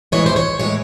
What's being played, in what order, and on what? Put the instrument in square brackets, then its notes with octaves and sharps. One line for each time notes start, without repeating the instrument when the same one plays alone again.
[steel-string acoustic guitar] A2 E3 G#3 C#5
C5
C#5
A2 E3 G#3 C#5